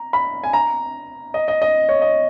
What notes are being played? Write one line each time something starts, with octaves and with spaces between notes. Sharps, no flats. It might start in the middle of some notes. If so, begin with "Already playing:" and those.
Already playing: A#5
B5
G#5
A#5
D#5
D#5
D#5
C#5
D#5